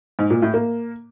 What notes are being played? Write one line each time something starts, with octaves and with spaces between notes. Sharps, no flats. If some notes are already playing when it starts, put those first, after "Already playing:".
G#2
A#2
A2
A#3